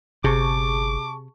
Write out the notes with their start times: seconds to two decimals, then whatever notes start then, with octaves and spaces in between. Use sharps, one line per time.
0.24 G1 C3 G#4 A5 C#6 D6